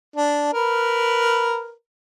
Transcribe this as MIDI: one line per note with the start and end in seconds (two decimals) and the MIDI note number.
0.16 0.52 62
0.53 1.72 70
0.53 1.72 71